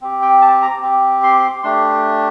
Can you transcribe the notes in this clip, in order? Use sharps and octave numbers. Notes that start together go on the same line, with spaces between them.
C4 G4
G5
A5
A#5
C4 G4
C6
C6
A3 D4 G4 C6